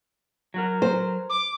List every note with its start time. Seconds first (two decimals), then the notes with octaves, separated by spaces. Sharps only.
0.54 F#3 F#4 A#4
0.82 C5
1.30 D6